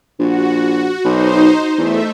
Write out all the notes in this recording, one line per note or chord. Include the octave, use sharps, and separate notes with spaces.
A#1 F#4
B1 D#4 C5
E2 A3 E5